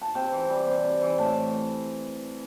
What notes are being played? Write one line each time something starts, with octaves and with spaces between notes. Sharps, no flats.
A5
C3 G5
E3
G3
C3
C3
E3
A2 A5